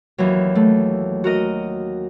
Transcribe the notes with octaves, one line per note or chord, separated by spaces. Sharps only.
D#2 E3 F#3
A3
F#4 A#4 D#5